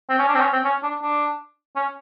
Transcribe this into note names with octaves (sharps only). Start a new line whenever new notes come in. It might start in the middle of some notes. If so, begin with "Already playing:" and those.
C4
C#4
D4
C4
C#4
C4
C#4
D4
D4
C#4